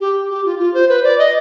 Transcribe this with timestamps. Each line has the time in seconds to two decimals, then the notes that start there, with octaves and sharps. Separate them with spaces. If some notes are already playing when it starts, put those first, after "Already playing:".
0.01 G4
0.30 G4
0.45 F4
0.59 F4
0.74 C5
0.89 B4
1.04 D5
1.19 D#5